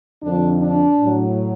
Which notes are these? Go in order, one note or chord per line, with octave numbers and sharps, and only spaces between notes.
F2 D3 F3 D4
D4
A2 F#3